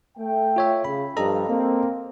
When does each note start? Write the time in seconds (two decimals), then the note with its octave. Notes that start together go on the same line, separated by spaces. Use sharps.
0.18 A3 G5
0.56 F4 C#5 E5
0.85 C#3 B5
1.17 G2 F3 G3 A4 D#5 A#5
1.48 A#3 C4